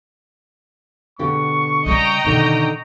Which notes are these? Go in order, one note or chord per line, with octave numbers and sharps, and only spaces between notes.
B2 D3 G4 C#6
C#3 G3 D#5 G5 A#5
B2 D3 D#3